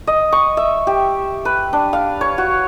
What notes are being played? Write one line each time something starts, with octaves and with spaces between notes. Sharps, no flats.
D#5
C#6
E5
G4
B4
D4
F5
C#5
F#4